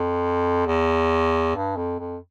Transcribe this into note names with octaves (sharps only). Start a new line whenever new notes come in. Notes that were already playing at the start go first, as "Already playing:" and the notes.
Already playing: F2
E2
G2
F2
F2